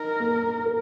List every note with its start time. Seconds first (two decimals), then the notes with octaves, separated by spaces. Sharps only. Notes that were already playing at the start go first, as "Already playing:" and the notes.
Already playing: D#4 A#4
0.20 A#3
0.66 A#4